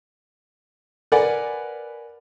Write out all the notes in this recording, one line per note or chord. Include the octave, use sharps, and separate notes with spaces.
A#4 B4 D5 F#5 G#5